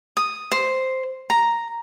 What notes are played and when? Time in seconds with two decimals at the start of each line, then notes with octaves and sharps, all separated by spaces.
0.17 D#6
0.52 C5
1.30 A#5